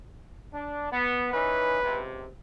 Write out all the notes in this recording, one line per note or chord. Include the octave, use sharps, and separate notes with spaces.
D4
B3
E3 C#4 D#4 B4
C#2 C3